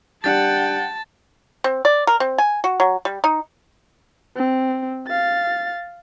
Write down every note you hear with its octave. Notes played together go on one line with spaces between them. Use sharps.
G3 D4 G4 F#5 G5 A5 A6
C4
D5
A#4
C4
G#5
F#4
F#3
G3
D#4
C4
F5 A6